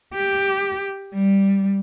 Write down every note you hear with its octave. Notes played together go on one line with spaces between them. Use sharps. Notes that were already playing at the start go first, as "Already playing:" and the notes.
G4
G3